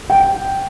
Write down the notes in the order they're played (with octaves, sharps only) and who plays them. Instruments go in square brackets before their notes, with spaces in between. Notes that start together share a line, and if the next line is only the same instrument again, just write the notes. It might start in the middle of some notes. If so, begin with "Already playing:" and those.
[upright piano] G5